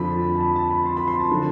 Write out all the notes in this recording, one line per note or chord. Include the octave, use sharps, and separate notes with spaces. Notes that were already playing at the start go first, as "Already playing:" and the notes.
Already playing: F2 D3 F3 B5
A5
B5
A5
B5
C6
B5
C6
A5
D3 F3